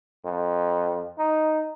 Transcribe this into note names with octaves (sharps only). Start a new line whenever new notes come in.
F2
D#4